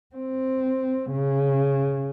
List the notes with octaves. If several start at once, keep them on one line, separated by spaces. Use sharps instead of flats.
C4
C#3